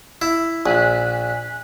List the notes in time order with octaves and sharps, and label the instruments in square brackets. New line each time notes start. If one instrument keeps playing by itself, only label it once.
[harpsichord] E4
[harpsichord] A#1 [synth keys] G#5 F#6 B6